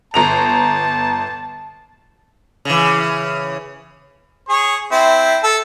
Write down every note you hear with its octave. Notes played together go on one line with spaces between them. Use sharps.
G1 A5 A#5 F7
C#3 E3
G#4 C#5
C4 E4
A4